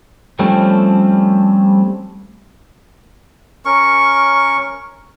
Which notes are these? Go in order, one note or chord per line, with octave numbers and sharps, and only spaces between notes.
F3 G3 A3 C4 C#4
C#4 A#4 C#6